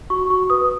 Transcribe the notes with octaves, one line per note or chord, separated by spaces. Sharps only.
F#4 C#6
F#4 C#6
B4 D#6